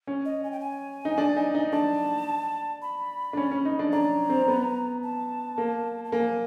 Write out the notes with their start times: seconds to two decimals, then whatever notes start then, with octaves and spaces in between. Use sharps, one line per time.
0.07 C#4
0.25 D#5
0.44 G#5
0.52 G5
0.60 G#5
1.05 D#4
1.18 D4
1.36 D#4
1.55 D#4
1.72 D4 A5
2.82 B5
3.33 D4
3.37 C#4
3.51 C#4
3.65 D#4
3.79 D4
3.93 D4 A#5
4.30 C4
4.48 B3
5.03 A5
5.58 A#3
6.05 A5
6.12 A#3 G#5